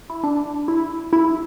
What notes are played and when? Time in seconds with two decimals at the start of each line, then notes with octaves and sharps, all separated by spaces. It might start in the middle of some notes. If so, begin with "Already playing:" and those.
0.10 E4
0.24 D4
0.68 E4
1.13 E4